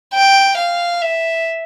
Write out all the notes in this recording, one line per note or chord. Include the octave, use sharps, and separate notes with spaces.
G5
F5
E5